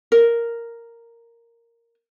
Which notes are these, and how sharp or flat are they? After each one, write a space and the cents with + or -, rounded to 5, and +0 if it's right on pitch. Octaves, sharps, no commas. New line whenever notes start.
A#4 -5